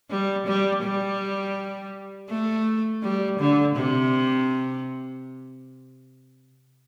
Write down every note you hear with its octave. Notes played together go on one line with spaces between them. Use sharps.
G3
G3
G3
A3
G3
D3
C3